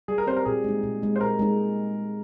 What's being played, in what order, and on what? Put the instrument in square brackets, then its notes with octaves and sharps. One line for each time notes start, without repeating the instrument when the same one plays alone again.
[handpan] G3 [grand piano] G#4
[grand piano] A#4
[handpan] C4 G4 [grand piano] C5
[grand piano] A#4
[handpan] A#2 [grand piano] G#4
[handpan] G#3 D#4
A#2
G#3 D#4
[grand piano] C5
[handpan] A#2 [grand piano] A#4
[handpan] G#3 D#4